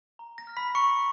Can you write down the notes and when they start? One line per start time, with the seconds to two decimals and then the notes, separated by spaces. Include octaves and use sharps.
0.19 A#5
0.38 A#6
0.47 F6
0.57 B5 B6
0.75 A#5 C#6 C#7